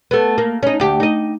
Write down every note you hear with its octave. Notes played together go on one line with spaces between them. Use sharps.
A3 B3
A#3
C#4 D#4
D2 G4
D#4 D#5